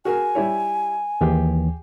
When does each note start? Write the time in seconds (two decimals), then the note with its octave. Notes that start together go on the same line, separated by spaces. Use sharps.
0.05 F#4 G#4 A#4 G#5
0.35 G3 E4 C#5
1.21 D#2 E3 G4 G#4